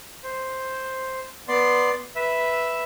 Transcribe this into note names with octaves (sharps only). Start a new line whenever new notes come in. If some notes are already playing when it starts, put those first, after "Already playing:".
C5
B3 D5 C6
B4 E5